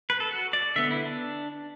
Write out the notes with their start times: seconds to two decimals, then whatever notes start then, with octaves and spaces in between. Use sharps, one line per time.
0.10 B4
0.20 A4
0.31 F#4
0.53 D5
0.76 D3 B3 E5
0.91 E4
1.06 D4